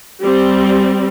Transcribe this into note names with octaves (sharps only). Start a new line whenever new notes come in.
G3 C4